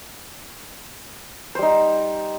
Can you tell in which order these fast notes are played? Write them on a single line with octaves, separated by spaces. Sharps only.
C5 G3 D#4